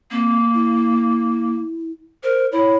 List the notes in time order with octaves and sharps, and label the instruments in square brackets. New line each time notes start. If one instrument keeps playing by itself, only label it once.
[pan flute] A#3 [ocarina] C4
[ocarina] E4
[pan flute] A#4 [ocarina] C5
[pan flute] E4 [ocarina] C#5